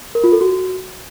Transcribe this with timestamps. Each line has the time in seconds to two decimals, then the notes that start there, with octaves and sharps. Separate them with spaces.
0.15 A#4
0.24 F4
0.32 A4
0.41 F#4